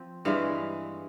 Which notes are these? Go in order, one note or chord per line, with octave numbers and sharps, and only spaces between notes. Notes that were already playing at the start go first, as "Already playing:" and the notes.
Already playing: F3 C4
G2 E3 G#3 E4 F5